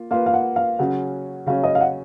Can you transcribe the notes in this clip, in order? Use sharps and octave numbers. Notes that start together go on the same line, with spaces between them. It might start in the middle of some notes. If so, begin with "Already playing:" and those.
Already playing: A#3 F4
A#3 F4 B4 F5
F5
F#5
F5
C#3 F#3 C#4 F#5
C#3 F#3 C#4 F5
D#5
F5
F#5